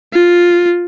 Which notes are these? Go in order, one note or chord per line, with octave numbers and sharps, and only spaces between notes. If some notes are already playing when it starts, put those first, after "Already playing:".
F4